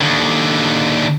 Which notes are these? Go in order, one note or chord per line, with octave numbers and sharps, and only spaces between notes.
D#2 D3